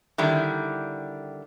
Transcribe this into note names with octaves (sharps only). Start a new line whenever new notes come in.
D3 D#3 G3 E4